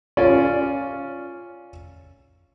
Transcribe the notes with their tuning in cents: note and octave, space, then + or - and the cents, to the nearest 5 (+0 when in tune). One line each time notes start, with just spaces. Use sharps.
C#4 +0 F4 +0 D5 +0